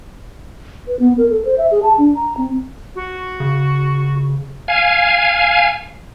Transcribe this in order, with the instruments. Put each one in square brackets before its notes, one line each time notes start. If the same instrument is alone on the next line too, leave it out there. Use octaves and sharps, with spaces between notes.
[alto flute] B4
B3
A#4
A4
C5
E5
G#4
A5
D4
A#5
C4
[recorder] F#4
[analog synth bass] C#3
[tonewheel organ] F5 G#5